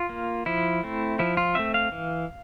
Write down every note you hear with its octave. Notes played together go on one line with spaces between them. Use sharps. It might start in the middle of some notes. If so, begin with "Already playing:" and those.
Already playing: F4
A#3
F3 E4
A3 C4
F3 E4
F4
A3 C4 E5
F5
E3